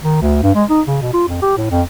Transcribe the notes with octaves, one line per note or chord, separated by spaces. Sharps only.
D#3
D2
G2
G#3
D#4
C#3
B2
F4
F2
G4
A2
F2